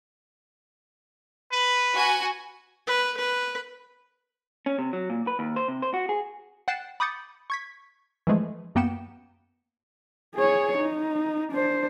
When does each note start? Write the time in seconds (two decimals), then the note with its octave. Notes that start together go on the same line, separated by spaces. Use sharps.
1.52 B4
1.95 F#4 G#5
2.87 B4
3.17 B4
4.66 C#4
4.79 C3
4.93 F#3
5.10 A#2
5.27 B4
5.39 D#2
5.56 C5
5.68 C3
5.82 C5
5.94 F#4
6.09 G#4
6.68 F#5 G5 F#6 A6 C7 E7
7.00 B5 D6 D#6 G6 A6 C#7
7.50 C#6 G#6 B6
8.27 E3 F3 G#3 A3
8.75 F#2 A#3 B3 G5 C#7 E7
10.35 G#4 C#5
10.78 D#4
11.52 D4 C5